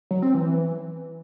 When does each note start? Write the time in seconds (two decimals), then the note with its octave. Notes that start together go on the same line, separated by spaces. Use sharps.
0.11 F#3
0.22 C4
0.34 E3